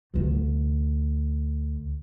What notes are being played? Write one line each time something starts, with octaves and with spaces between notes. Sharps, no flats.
D2 C3